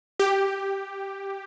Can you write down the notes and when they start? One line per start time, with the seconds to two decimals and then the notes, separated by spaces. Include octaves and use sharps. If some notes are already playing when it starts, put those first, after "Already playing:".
0.20 G4